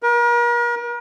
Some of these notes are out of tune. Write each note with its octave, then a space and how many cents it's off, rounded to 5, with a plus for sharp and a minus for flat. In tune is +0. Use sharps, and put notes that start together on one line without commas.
A#4 +40